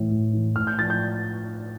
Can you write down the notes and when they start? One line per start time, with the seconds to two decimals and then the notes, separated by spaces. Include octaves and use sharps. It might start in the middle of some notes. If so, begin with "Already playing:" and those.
Already playing: A2 E3
0.11 A2
0.33 E3
0.56 A2 F6
0.67 G6
0.78 F3 A6
0.90 G6